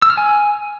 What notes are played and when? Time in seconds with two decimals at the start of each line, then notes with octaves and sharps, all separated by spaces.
0.02 E6
0.10 F6
0.17 G#5